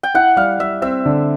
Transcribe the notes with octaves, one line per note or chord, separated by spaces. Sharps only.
G5
E4 F#5
G3 F5
G3 E5
C4 E5
D3